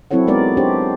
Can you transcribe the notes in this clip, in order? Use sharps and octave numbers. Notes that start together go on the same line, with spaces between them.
F#3 C4 E4 A4 C#5 F#5
G#3 B3 D#4 A#4 D5
D4 G4 C5 C#5